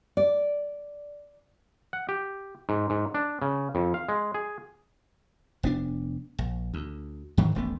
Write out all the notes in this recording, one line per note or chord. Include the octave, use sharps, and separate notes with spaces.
D5
F#5
G4
G#2
G#2
D4
C#3
F2
F5
G#3
G#4
F1 B3 D4
A#1
D2
G#2 D#3 E3
D#1 A1 A3 B3